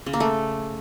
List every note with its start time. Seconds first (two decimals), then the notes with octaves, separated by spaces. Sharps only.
0.06 C#3
0.13 A#3
0.20 A3